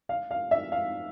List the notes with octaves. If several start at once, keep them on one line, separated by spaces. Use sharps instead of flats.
F5
F5
E5
F5